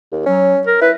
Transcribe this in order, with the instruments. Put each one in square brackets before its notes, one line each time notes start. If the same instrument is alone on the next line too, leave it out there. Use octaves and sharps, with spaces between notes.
[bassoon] D#2
[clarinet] F#3 [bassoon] C#4
[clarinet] A#4
[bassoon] E4 [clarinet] B4